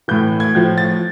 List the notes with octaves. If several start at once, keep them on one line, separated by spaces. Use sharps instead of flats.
A2 E3 G6
G#6
A2 F3 G6
A6